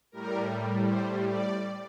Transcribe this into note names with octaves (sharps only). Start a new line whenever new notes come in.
A2 G3 A#4
C5
D5